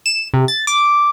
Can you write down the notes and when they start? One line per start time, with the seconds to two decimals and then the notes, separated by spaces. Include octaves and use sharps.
0.06 E7
0.34 C3
0.48 A6
0.67 D6